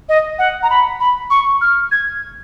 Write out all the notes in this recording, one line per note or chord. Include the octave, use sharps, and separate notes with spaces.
D#5
F#5
A#5
B5
B5
C#6
F6
G#6